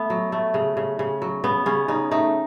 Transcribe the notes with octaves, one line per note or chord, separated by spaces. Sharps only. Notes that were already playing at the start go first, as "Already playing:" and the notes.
Already playing: A3 B3
F#3
A3
C#3
C#3
C#3
F#3
C#3 B3
C#3 C#4
C#3 D#4
A3 D#4